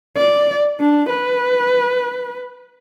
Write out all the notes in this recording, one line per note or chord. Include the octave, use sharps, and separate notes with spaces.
D5
D4
B4